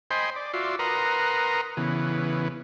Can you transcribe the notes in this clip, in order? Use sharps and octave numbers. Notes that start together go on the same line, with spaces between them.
C5 D#5 G5 G#5 B5 C6
D5
F4 F#4 D5 E5 C6
A#4 B4 F#5 A#5 C6 D#6
C#3 E3 B3